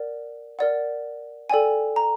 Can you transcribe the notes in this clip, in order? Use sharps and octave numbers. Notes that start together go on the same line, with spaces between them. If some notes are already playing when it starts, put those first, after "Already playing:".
Already playing: A#4 D5 F#5
A#4 D5 F#5
A4 D5 G5 G#5
A#5